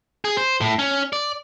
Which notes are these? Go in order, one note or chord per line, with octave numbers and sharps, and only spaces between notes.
G#4
C5
A2
C#4
D5